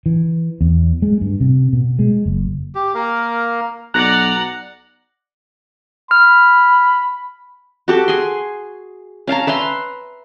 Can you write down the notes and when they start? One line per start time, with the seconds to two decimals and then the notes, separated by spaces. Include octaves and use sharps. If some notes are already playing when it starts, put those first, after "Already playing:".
0.06 E3
0.61 E2
1.02 G#3
1.21 G2
1.40 C3
1.73 B2
1.99 G#3
2.26 F#1
2.75 G4
2.94 A#3 A#4 F5
3.94 B1 D5 F#5 A#5 F#6 A#6
6.11 B5 F6
7.88 F#4 G4 A4
8.08 G#4 C6
9.27 C#4 F5 A5 A#5
9.47 B4 E5 A#5 C6